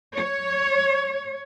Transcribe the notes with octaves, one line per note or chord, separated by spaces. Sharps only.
C#5